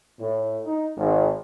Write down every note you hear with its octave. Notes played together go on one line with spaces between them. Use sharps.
A2
D#4
G#1